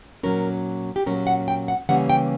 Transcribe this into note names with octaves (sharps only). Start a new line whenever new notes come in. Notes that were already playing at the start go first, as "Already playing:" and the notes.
A#2 F#3 C#4 A#4
G4
A#2 F#3 C#4 A#4
F#5
G5
F#5
C#3 E3 G3 A#3 C#4 F#5
G5